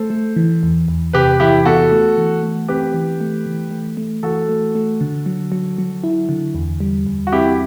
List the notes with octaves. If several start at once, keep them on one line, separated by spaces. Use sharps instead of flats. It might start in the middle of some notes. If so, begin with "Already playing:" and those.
Already playing: A3 A4 C5
A3
E3
E2
E2
C3 G4 B4
E3 E4 G4
B3 F#4 A4
A3
E3
A3
C4 G4 B4
E3
A3
E3
A3
A3
E3 F#4 A4
A3
A3
D3
F#3
F#3
F#3
E4
D3
E2
G3
E2
F#4
C4 E4 G4